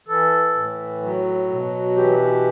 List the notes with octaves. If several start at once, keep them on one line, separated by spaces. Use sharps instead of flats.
E3 A4
A2
F#3
B2
E3 G4